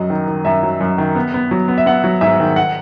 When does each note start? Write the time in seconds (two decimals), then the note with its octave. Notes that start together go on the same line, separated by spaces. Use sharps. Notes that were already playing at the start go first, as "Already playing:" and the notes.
Already playing: F#2 F#3 D#5
0.10 D#3
0.28 D#3
0.45 F#2 E5
0.63 F#3
0.81 F#2
0.98 D#3
1.16 B3
1.34 B3
1.51 F#3
1.68 B3
1.78 E5
1.86 B3 F#5
2.04 F#3
2.21 G#2 E5
2.40 D#3
2.56 F#5